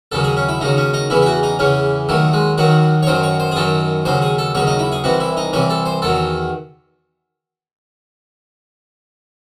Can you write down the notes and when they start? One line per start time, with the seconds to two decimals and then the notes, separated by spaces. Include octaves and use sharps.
0.12 D#2 C#3 F#3 A4
0.24 G#4
0.37 C#4
0.49 E4
0.61 D#2 C#3 F#3 D#4
0.78 C#4
0.94 D#4
1.10 E2 C#3 E3 E4
1.22 E4
1.26 F#4
1.43 D#4
1.59 E2 C#3 E3 C#4
2.09 D#2 D#3 F#3 A3
2.33 G#3
2.58 D#2 D#3 F#3 F#4
3.03 C#5
3.07 F#2 D#3 F#3 C5
3.23 C#5
3.40 C5
3.51 G#4
3.56 F#2 D#3 F#3 A4
4.05 D#2 C#3 F#3 C5
4.22 G#4
4.38 A4
4.55 D#2 C#3 F#3 C#5
4.67 D#4
4.79 E4
4.92 G#4
5.04 C2 C3 E3 F#4
5.20 E4
5.37 D#4
5.53 C2 C3 E3 C#4
5.70 A4
5.86 C5
6.02 E2 D#3 F#3 A4